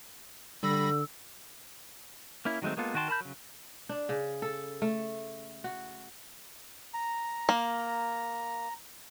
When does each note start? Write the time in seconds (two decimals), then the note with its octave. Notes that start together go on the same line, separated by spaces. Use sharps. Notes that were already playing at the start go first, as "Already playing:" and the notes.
0.63 D3 G3 B5 E6 A#6
2.45 A#3 C#4 E4
2.62 D#3 F#3 G#3 A3 C4
2.77 G#3 A#3 B3 F4 A4
2.94 D#3 F#4 G5 A5 C6
3.08 A#4 A5 B5 G6
3.20 C#3 F#3
3.89 D4
4.09 C#3
4.42 A4
4.82 A3
5.64 F#4
6.94 A#5
7.49 A#3